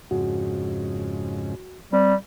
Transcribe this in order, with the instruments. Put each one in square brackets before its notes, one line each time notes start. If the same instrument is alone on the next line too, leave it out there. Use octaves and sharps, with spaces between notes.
[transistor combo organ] F2 G#2 C#3 [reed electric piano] F#4
[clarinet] G3 [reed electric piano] C4